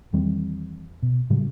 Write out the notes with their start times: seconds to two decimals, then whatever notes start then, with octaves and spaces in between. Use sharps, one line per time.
0.13 E2 D#3 G3 C4
1.02 B2
1.30 A2 C#3 F#3 G3